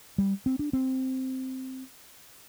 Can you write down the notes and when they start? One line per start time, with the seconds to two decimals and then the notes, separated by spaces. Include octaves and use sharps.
0.18 G3
0.46 C4
0.59 D4
0.73 C4